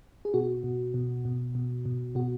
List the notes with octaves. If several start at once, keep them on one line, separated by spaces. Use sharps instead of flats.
G#4
B2 F#4
B2
B2
B2
B2
B2
B2 F#4